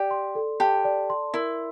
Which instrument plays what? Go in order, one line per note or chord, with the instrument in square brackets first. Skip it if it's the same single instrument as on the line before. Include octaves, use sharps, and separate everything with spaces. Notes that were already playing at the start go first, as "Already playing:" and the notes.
Already playing: [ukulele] G4 [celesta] D5
[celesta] C6
A4
[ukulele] G4 [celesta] A5
[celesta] D5
C6
[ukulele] E4 [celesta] A#4